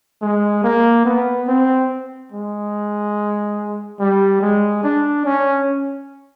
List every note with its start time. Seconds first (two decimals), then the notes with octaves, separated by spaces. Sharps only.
0.22 G#3
0.64 A#3
1.05 B3
1.48 C4
2.32 G#3
4.00 G3
4.41 G#3
4.84 D4
5.25 C#4